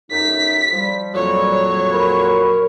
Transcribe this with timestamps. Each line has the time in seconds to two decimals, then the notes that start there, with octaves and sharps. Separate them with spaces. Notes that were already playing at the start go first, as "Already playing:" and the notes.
0.11 F#2 D#4 B6
0.71 F3 G3
1.15 F2 A#2 F#3 C#5
1.93 A#4 B5 C#6